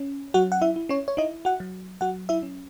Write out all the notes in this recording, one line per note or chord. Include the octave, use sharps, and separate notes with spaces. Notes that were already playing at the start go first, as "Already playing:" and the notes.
Already playing: C#4
F#3 F#4 F#5
F#5
E4 E5
E4
C#4 C#5
C#5
D#4 E4 D#5
F#4 F#5
F#3
F#3 F#4 F#5
E4 E5
C#4